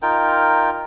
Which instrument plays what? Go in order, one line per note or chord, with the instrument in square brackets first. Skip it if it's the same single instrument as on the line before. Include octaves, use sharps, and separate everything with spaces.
[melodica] D#4 F4 A#4 G5